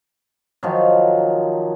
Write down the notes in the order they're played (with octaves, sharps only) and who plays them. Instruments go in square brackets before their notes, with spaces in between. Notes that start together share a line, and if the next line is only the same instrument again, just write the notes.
[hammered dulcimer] D#3 F3 F#3